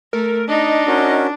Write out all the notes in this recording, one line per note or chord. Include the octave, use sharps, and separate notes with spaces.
A3 A#4
D4 D#4 D#5
C#4 F#4 A#4